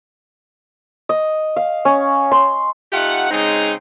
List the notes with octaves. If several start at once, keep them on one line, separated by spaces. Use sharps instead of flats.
D#5
F5
C#4
C6
A3 D#4 F4 G4 F#5
C#3 G#3 C4 D#4